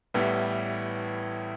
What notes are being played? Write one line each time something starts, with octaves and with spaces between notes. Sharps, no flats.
A1 A2 E3 G3 B3